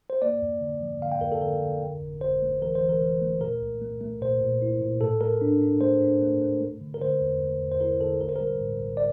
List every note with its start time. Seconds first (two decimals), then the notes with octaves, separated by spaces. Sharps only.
0.10 C5
0.22 A#3 D5
0.42 F2
0.61 D3
0.81 F3
1.01 D3 F5
1.12 G5
1.21 F2 A#4
1.32 A4
1.41 D3 A#4
1.62 D3
1.82 F2
2.02 G1
2.21 G1 C5
2.42 A3
2.61 E3 A#4
2.75 C5
2.81 E3
2.89 A#4
3.01 E3
3.22 A3
3.41 A#2 A#4
3.61 C2
3.82 A3
4.01 A3
4.21 A#2 C5
4.41 A#2
4.62 E4
4.81 A#2
5.01 A2 A4
5.21 A3 A#4
5.41 D4
5.61 D4
5.81 A3 C5
6.02 D4
6.22 A3
6.41 A3
6.61 A3
6.81 D3
6.94 A#4
7.01 D3 C5
7.21 E2
7.41 A3
7.61 E2
7.71 C5
7.81 E4 A#4
8.01 D3 A4
8.21 A#1 A#4
8.29 C5
8.36 G3 A#4
8.61 A2
8.81 A#1
8.97 D5